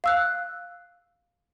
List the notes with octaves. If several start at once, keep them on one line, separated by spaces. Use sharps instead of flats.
F5 E6 F#6